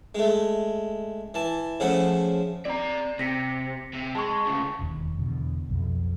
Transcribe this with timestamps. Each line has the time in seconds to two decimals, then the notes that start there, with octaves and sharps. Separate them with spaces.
0.15 G#3 A3
1.34 E3 A5
1.80 C#3 F3 A3 F#5
2.65 C4 D5 A#5
3.19 C3 A#6 B6 C#7
3.93 C3
4.15 G#3 A5 C#6
4.46 D2 C#3
4.79 E1 D#2
5.18 E2 B2 D3
5.69 B1 F2